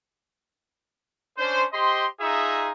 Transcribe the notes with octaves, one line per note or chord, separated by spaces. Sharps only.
C#4 D4 C5
G4 C5 D#5 C6
D#4 F4 G#4 E5 A#5